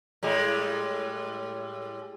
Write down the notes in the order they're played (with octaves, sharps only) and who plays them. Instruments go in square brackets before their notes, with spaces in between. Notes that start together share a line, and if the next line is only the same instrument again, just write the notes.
[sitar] A2 G3 G#3